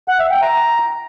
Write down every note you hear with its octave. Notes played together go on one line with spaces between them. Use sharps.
F#5
E5
G5
A#5